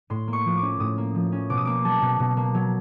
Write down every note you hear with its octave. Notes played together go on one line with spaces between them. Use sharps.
A2 C6
A#3
C#6
F3
D6
C#4
A2 D#6
A#3
F3
C#4
B2 D6
D#6
A#3 D6
F#3 A5
B2
B2
A#3
F#3